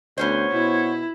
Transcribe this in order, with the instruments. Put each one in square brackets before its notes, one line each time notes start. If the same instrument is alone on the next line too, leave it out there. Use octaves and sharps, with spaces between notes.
[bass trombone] D2 [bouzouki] B3 C#4 C5 [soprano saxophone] C#5
[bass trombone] B2 [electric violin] E4